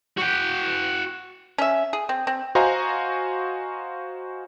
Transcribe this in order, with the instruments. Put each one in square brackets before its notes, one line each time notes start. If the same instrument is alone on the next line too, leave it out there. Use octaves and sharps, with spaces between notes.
[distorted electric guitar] F#4 G5
[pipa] C#4 E5
G#4
C4
C4
[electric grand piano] F#4 C5 D#5 F5 G#5 A#5